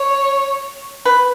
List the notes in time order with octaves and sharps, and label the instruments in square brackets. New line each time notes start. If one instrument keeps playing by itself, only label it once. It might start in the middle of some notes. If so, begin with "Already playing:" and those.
Already playing: [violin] C#5
[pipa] B4